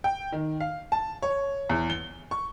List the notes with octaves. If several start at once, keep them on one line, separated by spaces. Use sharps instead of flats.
G5
D#3
F5
A5
C#5
E2
G7
C#6